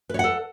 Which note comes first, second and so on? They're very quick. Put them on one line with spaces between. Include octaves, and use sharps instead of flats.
B4 C#5 F#5 A4